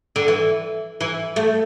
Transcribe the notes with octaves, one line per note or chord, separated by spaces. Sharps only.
D3
E3
E3
A3